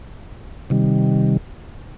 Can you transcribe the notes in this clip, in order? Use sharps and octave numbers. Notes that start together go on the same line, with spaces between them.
C3 D#3 G3